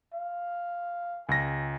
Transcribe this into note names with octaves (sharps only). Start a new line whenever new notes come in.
F5
C#2 G#5 A#6